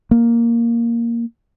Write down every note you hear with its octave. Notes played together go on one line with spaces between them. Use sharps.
A#3